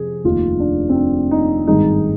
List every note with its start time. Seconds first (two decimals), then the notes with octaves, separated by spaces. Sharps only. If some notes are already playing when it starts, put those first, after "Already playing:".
Already playing: F2 C3 G#4
0.24 F1 D#2 D#3 F4
0.60 D4
0.89 C4
0.95 D4
1.31 D#4
1.67 G#1 G2 D#3 G#3 D#4